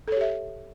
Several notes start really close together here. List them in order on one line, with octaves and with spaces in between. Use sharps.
A4 C#5 G4 E5